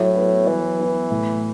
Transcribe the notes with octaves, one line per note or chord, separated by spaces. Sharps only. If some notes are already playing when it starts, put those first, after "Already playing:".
Already playing: A2 F#3
B3 E4 B4
E3 F#3
B3 E4 B4
A2